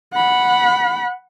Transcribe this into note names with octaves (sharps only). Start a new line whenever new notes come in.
F#5 B5